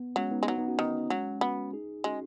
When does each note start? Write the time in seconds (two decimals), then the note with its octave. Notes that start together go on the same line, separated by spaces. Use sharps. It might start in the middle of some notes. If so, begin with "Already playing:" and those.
Already playing: B3
0.16 F#3 G#3 C#4
0.31 B3 D#4
0.43 G#3
0.47 F#3 B3 D#4
0.58 B3 D#4
0.68 C#4 F#4
0.79 D#3 B3 D#4
1.10 F#3 G#3 C#4
1.41 B3 C#4 F#4
1.73 D#4 G#4
2.04 G#3 C#4 F#4